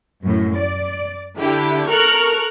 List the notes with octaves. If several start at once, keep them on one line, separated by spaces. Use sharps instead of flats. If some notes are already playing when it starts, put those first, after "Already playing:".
F#2 A2
D5
D3 E4 G4
A4 A#4 C#6 F6 F#6